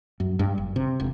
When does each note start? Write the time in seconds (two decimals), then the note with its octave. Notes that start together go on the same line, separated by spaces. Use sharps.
0.20 F#2
0.39 G2
0.58 F#1
0.76 C3
1.00 E1